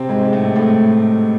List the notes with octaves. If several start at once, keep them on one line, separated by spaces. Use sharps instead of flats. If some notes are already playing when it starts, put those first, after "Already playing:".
Already playing: C3 C4
G#2 G#3
G#3
A2 A3
A2 A3